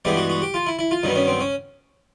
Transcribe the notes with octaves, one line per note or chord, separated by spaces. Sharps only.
G2 E3 G#3 B3 G4
F#4
F#4
G4
F4
E4
E4
F4
G2 D#3 F#3 B3 D#4
C#4
C4
C#4